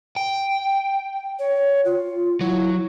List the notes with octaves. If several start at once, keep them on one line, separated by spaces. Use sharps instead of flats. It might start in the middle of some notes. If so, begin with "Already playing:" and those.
G5
C#5
F4
F#3 E4